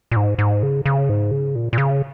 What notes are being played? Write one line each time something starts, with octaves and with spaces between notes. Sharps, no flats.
A#2
G#2
G#2
C#3
C#3
G#2
C#3
A#2
A#2
C#3